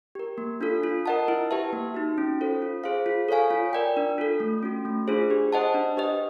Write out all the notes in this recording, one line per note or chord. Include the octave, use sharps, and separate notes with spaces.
G4 A#4
A#3
D4 F4 A4
F4
A#4 D#5 F#5 A5
E4
G4 B4 E5 A5
A#3
D#4 F#4
C#4
F4 A4 C5
F4
G#4 C5 F5
F4
A4 C#5 F5 G#5
F4
A#4 D5 G5
D4
F4 A4
A3
C#4 F#4
A3
D4 F4 G#4 C5
G4
C5 D#5 F#5 A5
D4
G4 B4 D#5